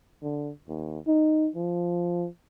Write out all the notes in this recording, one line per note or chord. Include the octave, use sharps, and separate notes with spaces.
D3
D#2
D#4
F3